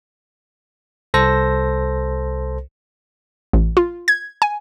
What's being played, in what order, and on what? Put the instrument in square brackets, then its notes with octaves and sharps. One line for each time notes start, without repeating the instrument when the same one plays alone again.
[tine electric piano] C2 A4 C5 A#6
[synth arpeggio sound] A1
F4
G#6
G#5